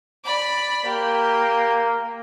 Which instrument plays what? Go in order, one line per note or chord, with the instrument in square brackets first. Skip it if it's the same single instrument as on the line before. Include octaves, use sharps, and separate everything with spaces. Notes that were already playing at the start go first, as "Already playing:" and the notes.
[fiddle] D5 B5
[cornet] A#3 [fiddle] G4